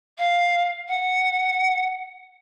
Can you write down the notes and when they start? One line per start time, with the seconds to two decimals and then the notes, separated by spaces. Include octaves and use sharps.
0.18 F5
0.88 F#5